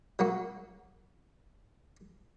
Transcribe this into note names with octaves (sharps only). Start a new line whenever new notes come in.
F#3 A#3 F#4